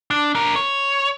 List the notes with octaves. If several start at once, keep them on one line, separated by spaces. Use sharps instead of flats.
D4
D4 A#4
C#5